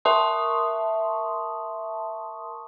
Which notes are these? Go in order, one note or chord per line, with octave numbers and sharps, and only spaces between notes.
A#4 E5 A5 C6 C#6 D#6